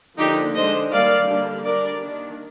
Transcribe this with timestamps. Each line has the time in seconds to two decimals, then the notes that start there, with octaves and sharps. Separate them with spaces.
0.18 D3 F3 A#3 D4 D#4 G4
0.55 D3 G#3 D4 C5 D#5
0.91 D#3 G3 A#3 D4 D5 F5
1.28 D3 G3 A#3 D4
1.64 G3 D4 A#4 D5
2.00 D#3 A#3 D4